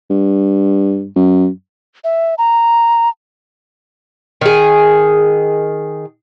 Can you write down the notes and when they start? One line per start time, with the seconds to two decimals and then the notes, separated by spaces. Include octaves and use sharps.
0.10 G2
1.16 F#2
2.04 E5
2.38 A#5
4.41 D#3 G#4